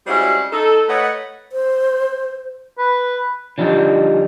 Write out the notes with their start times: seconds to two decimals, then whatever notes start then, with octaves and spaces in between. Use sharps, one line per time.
0.07 G3 G#3 C4 C#4 E4 F#4
0.52 D#4 A4
0.88 A3 B4 C#5 D#5 F#5
1.52 C5
2.78 B4
3.58 D3 F3 G3 D#4